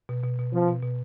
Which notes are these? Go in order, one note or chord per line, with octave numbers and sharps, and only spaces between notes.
B2
B2
B2
F3 C4
B2
B2